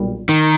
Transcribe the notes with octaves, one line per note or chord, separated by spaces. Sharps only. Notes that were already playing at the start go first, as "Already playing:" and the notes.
Already playing: B1 A#2 G3
D#3